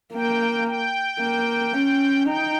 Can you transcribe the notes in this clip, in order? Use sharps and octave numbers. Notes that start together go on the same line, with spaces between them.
A#3 G5
G5
A#3
C#4
D#4 G5